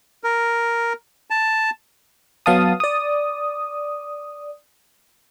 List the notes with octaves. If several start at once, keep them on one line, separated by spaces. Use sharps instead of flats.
A#4
A5
F#3 B3 F5 A5 D#6
D5 D#6